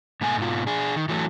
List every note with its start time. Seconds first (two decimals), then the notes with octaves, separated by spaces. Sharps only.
0.21 G#2 B2 A3 G#5
0.38 G#2 B2 F4
0.67 D4 G#4
0.96 D#3
1.09 E3 F#3 A3